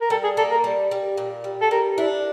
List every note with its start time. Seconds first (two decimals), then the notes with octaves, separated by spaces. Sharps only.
0.01 A#4
0.10 G3 A4
0.24 G#4
0.37 A#3 A4
0.51 A#4
0.64 G3
0.91 G3
1.18 A#2
1.44 G3
1.62 A4
1.71 G3 A#4
1.98 D4 E4